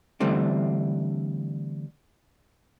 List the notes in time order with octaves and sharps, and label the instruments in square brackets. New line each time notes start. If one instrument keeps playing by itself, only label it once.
[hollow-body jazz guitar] D3 E3 G3 A3 C4 D4